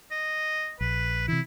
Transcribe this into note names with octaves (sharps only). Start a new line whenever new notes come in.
D#5
A#1 B4
C3 E3 E4